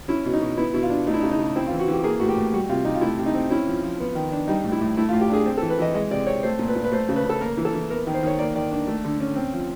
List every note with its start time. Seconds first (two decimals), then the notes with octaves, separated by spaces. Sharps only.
0.08 C#4 E4
0.25 B2
0.33 D#4
0.41 B2
0.57 B3 E4
0.74 B2 E4
0.83 F4
0.90 D4
1.07 A3 D#4
1.14 E4
1.20 C#3 D#4
1.31 D#4
1.39 C#3
1.56 C4 E4
1.67 F4
1.71 E3
1.80 F#4
1.88 E3 G4
2.03 A#3 G#4
2.20 A2 F#4
2.29 G4
2.37 A2
2.53 G3 F#4
2.69 C3 F4
2.85 C3 D#4
2.95 F4
3.01 A3 E4
3.19 C3
3.26 D#4
3.34 C4
3.50 C#4 E4
3.67 F3
3.83 F3
4.00 B3
4.15 D#3
4.32 D4
4.48 G3 D#4
4.64 A2
4.72 E4
4.81 A2
4.97 A3 E4
5.09 F4
5.13 A2
5.21 G4
5.30 D4 G#4
5.45 C4
5.57 A4
5.62 E3
5.70 B4
5.79 E3 D#5
5.94 G#3 D#5
6.11 C3 D5
6.27 C4 C#5
6.43 A3 C5
6.59 A#2
6.68 B4
6.76 A#2
6.84 B4
6.92 A3 C5
7.09 C#3
7.16 B4
7.25 C#3 A4
7.40 A#3 A#4
7.57 E3
7.65 A4
7.74 E3
7.90 B3 A#4
8.07 D#3
8.14 C5
8.23 D#3 C#5
8.39 A#3 D5
8.55 D#3 D5
8.71 D4
8.87 A3
9.04 D3
9.20 C#4
9.36 C4
9.53 F3